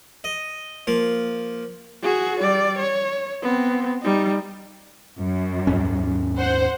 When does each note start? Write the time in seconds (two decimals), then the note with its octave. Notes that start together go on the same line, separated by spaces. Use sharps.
0.24 D#5
0.87 F3 A#3
2.03 F#4 G#4
2.40 G3 D5
2.79 C#5
3.42 B3 C4
4.02 G3 D#4
5.19 F#2
5.67 D#2 G#2 C#4
6.39 C5 F#5